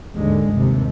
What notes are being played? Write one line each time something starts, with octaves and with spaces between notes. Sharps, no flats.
D#2 G#2 D3 G#3
G1 D#2 C3